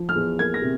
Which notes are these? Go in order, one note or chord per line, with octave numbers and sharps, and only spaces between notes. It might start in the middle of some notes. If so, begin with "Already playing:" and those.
Already playing: F3
F6
E2
A#3 G#6
A#6
C3